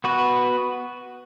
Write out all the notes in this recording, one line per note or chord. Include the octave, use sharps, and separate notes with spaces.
B3 F#4 B4